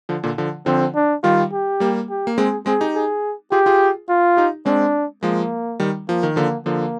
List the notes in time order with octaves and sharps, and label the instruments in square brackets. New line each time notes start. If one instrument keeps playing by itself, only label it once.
[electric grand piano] D3 F3
A#2 D3
D3 F3
[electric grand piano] D3 F3 [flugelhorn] C4
[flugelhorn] D4
[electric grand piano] D#3 G3 [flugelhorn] F4
[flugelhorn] G4
[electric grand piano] G3 A#3
[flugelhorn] G4
[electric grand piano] A#3
[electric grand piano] G#3 C4 [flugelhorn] G#4
[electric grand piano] G#3 C4 [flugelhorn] G#4
[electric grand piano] D#4 G4
[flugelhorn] G#4
[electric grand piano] F4 G#4 [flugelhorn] G4
[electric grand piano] F4 G#4
[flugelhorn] F4
[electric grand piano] D#4 G4
[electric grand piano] G#3 C4 [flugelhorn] D4
[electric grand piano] F3 G#3 [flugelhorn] A#3
[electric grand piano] D#3 G3
[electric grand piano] F3 [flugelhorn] A#3
[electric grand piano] D#3
[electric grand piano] D3 F3 [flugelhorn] A#3
[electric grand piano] D3 F3 [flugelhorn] A#3